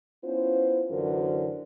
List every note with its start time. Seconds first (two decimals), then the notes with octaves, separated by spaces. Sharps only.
0.24 B3 C#4 E4 F4 C5
0.90 F#2 D3 E3 F#4 A#4 C5